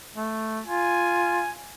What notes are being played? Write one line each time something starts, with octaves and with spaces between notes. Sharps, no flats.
A3
F4 G#5